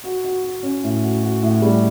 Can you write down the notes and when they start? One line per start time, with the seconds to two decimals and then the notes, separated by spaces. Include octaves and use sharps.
0.04 F#4
0.24 F#4
0.44 F#4
0.63 C#4
0.84 A2
1.03 F#4
1.23 F#4
1.43 A2
1.62 G3